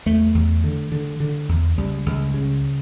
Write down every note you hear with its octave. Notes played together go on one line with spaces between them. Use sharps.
E2 A3
E2
D3
D3
D3
E2
C#2 G3
C#2
C#3